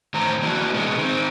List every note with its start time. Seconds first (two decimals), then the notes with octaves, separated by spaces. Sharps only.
0.14 A2 D#3 C5 A#5
0.42 A#3 D4 E4 F#4
0.74 A#2 G#3 B3
0.98 D#3 C4